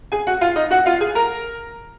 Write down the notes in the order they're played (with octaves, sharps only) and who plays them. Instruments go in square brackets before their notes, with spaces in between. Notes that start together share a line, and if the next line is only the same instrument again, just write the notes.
[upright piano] G#4 G#5
F#4 F#5
F4 F5
D#4 D#5
F#4 F#5
F4 F5
G#4 G#5
A#4 A#5